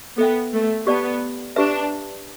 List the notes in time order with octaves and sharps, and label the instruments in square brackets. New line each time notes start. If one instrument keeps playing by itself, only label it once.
[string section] B3 [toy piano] A4 E5 G5
[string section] A3
[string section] B3 [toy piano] G4 D5 A5
[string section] D4 [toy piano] G4 B4 E5